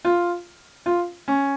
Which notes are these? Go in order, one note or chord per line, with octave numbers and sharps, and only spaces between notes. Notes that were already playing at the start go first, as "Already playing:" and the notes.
F4
F4
C#4